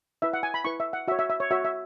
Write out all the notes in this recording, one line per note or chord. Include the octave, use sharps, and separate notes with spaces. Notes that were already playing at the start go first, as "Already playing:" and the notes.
E4 B4 E5
F#5
G#5
B5
E4 B4 C#6
E5
F#5
F#4 C#5 E5
E5
E5
C#5
F#4 C#5 E5
E5